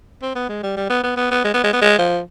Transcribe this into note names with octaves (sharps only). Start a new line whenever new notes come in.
C4
B3
G#3
G3
G3
B3
B3
B3
B3
G#3
B3
G#3
B3
G#3
F3